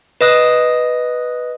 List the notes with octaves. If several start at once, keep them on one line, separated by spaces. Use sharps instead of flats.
B4 D#5 D#6 F#6